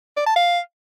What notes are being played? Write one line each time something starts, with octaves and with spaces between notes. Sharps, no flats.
D5
A5
F5